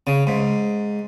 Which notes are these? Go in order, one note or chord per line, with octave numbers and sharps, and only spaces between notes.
C#3
G#2